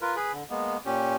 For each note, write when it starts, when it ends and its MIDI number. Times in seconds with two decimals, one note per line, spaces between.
0.01 0.16 65
0.01 0.16 70
0.01 0.16 71
0.16 0.32 68
0.16 0.32 71
0.16 0.32 83
0.33 0.44 50
0.50 0.77 56
0.50 0.77 58
0.50 0.77 59
0.86 1.16 46
0.86 1.16 61
0.86 1.16 67